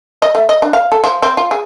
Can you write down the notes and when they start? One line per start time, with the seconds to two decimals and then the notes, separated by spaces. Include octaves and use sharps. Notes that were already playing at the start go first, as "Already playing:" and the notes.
0.22 D#5
0.35 A3
0.49 D#5
0.62 D4
0.73 F5
0.92 A4
1.04 F3
1.22 C4
1.37 F4
1.51 G#4